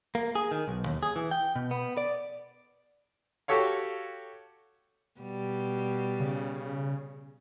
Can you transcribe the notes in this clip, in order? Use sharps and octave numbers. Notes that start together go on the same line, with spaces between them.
A#3
G#4
D#3
B1
D#2
G#4
E3
G5
B2
B3
D5
F#4 G4 A4 C#5 F5
B2 G3
C#3